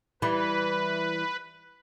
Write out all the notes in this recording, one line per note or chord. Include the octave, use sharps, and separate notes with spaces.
E3 G3 B4